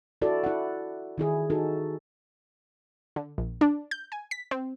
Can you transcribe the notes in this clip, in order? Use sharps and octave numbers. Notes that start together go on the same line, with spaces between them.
E4 F#4 A4 D5
E4 F#5
D#3 E4 G#4
D#4 F#4 A4
D3
A#1
D4
G6
G#5
B6
C4